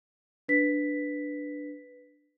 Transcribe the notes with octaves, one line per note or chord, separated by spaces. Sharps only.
D4 B4 B6